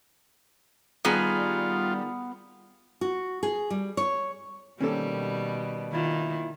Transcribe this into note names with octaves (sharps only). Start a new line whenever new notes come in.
D#3 G3 B3 F4 G#4
F#4
G#4
G3
C#5
B2 D#3 G3 A#3 C4 C#4 A4
D#2 D#3 E4 F4